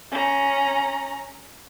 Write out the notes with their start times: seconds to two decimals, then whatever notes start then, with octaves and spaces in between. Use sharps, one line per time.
0.11 C#4 A#5